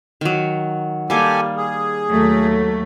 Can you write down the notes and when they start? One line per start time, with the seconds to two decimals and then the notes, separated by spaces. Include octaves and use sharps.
0.21 D#3 F#3
1.10 G3 A#3 G4 A4 G#5
1.57 G#4
2.09 D#2 F#3 A3